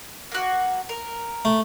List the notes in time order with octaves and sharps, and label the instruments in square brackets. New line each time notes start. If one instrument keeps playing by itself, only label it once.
[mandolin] A#3 F#4
A#4
[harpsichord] A3